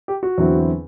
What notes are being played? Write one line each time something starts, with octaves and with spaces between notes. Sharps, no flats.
G4
F#4
E2 D3 F#3 C4 E4